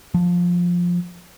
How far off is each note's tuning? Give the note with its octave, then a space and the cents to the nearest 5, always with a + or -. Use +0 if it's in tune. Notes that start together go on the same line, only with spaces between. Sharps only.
F3 +10